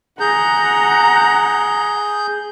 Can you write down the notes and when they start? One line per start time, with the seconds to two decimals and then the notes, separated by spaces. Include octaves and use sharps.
0.20 G#4 F#5 A#5 G6